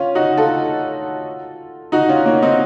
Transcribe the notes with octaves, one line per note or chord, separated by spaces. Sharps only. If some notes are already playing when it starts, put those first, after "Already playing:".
Already playing: C#4 F4
D#4 F#4
F4 A4
D#4 F#4
C#4 F4
A#3 C#4
C4 D#4